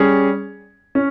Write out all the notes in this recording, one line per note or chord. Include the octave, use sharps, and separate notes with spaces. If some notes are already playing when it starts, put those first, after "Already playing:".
Already playing: G3 C#4 G#4
C#4